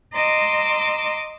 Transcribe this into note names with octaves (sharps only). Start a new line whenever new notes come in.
D#5 A#5 C6 D6 E6